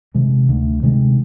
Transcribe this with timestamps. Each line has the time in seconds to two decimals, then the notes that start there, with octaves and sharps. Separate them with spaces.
0.14 C3 D#3 G#3
0.49 D2
0.83 C3 D#3 G#3